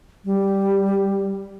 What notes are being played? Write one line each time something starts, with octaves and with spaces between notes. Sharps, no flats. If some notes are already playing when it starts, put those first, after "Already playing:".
G3